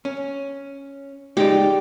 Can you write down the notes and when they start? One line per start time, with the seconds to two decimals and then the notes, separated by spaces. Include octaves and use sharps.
0.05 C#4
1.37 G#3 D#4 G4 D5